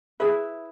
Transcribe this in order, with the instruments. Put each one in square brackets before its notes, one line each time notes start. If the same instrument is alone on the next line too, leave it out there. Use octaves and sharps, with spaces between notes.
[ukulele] E4 G#4 B4 E5